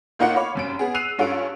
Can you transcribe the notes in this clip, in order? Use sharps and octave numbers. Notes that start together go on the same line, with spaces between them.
A2 A#3 D#4 F4 F#5 C#7
C#5 F5 B5 D6
F1 F#2 D7
B3 G#4
E6 F#6 C7 D#7 F7
G2 C#4 F4 A4 C#5 D7